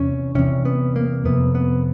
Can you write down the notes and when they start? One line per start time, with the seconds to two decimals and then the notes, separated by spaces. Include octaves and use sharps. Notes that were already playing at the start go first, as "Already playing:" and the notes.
Already playing: E2 C3 C#4
0.35 E2 C3 C#4
0.65 B3
0.96 A#3
1.25 F2 C3 B3
1.55 B3